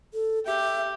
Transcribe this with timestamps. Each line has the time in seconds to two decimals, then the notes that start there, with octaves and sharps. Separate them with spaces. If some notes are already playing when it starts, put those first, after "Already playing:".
0.13 A4
0.46 G4 E5